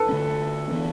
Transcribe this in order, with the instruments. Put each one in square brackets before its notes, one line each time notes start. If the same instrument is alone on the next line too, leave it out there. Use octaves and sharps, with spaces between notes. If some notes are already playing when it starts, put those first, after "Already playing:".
Already playing: [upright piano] A4 B4
[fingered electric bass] D3 A3 C#4
E3 B3 D4